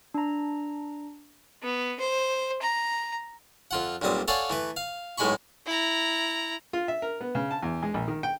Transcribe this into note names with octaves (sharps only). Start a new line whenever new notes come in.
D4 A#5
B3
C5
A#5
F2 F4 F#5
B1 A#2 G3 C4 D#6
A4 C#5 D5 F5 F#5 G#5
E3 A3 B4
F5
B1 A2 G#3 G#5 B5 C#6
E4 A#5
F4
E5
A#4
B3
C#3
A5
E2
G#3
A#1
D#3
G5